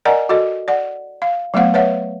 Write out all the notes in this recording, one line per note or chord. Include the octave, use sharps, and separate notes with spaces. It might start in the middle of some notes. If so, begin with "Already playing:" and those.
A#4 D5 D#5 F#5 G#5 A#5
F#4 A4 D#5
D5 F#5
F5
F#3 A3 B3 C5 F5 F#5
B4 C#5 E5 F#5